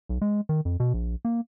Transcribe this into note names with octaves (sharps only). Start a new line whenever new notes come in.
B1
G#3
D#3
F2
B2
A#1
A#3